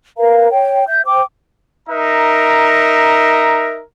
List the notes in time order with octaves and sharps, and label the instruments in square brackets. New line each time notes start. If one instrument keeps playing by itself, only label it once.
[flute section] A#4 B4 F5 A#5
C#5 G5
E5 G6
C5 G5 D6
[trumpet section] D#4 A#4 E5 A#5